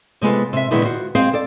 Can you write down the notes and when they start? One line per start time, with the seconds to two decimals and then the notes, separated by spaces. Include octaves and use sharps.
0.21 C3 G#3 B3 F4 A4
0.53 C3 E5
0.71 A#2 D3 D#3 G#3 B3 E4
0.85 F4 F#4 C5
1.15 G#3 C4 G#4 C5 F5
1.33 A4 D5